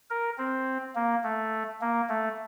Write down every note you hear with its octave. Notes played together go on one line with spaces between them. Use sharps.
A#4
C4
A#3
A3
A#3
A3